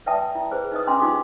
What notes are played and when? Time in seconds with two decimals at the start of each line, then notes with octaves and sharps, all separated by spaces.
0.06 B4 D5 E5 G5 A5 D#6
0.35 E4
0.52 G#4 B4 C5
0.72 D#4 B4 D#5 D#6
0.87 C#4 D4 A#5 C6 D6
1.00 D#4 F4 G4 G#4 D6 D#6